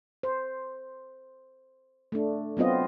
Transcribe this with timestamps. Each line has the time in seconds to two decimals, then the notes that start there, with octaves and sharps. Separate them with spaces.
0.23 C5
2.12 A3 D4
2.57 F#3 B3 C4 F4 D#5